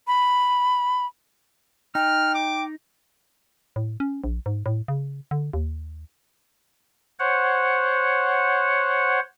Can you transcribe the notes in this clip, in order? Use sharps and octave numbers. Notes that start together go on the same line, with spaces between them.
B5
D#4 G5 F6
D6
A2
C#4
A#1
G#2
A2
C#3
D3
D#2
C5 C#5 F#5